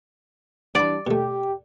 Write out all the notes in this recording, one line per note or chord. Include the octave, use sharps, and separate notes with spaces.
E3 G3 D4 D5 F#5 B5
B2 A3 G4